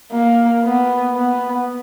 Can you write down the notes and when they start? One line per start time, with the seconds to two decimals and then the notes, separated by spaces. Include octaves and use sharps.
0.12 A#3
0.64 B3
1.16 B3